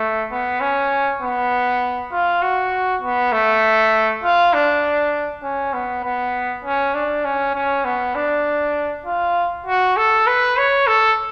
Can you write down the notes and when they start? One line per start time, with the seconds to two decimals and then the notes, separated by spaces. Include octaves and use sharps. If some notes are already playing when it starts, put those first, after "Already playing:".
Already playing: A3
0.31 B3
0.61 C#4
1.22 B3
2.12 F4
2.42 F#4
3.02 B3
3.32 A3
4.24 F4
4.54 D4
5.43 C#4
5.74 B3
6.04 B3
6.65 C#4
6.94 D4
7.25 C#4
7.55 C#4
7.85 B3
8.15 D4
9.06 F4
9.66 F#4
9.97 A4
10.27 B4
10.57 C#5
10.87 A4